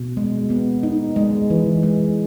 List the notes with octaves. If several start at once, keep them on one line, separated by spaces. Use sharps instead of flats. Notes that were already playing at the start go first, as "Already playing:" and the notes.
Already playing: B2
G#3
B3
D#4
G#3
E3
G#3